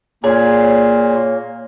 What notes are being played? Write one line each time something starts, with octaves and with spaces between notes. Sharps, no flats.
A#2 A#3 G#4 C#5